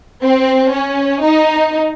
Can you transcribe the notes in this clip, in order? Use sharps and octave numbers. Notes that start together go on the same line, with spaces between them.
C4
C#4
D#4